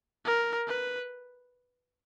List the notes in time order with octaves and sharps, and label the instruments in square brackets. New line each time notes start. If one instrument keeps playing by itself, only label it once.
[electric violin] A#4
B4